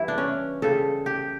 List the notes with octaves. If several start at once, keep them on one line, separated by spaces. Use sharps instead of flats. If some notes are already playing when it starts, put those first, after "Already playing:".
Already playing: G2 E3 G3 E4
D4
C#4
C#3 G3 A4
G4